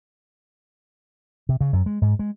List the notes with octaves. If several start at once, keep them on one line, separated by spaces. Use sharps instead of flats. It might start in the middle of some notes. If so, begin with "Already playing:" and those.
C3
C#3
F#2
G#3
G#2
G#3